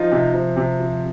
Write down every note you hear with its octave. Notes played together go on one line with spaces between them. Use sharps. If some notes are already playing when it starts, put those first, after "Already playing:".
Already playing: F3 D#4 F4
C3
F3
C3
F3